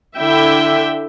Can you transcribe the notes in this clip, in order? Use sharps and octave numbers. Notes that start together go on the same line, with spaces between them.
D3 E4 E5 G5